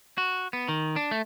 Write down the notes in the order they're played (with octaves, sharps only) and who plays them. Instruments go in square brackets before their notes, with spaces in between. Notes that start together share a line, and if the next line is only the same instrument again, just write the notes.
[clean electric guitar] F#4
B3
D#3
D4
A3